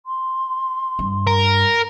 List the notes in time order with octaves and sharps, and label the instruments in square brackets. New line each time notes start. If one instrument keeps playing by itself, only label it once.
[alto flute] C6
[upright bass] G2
[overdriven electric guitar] A#4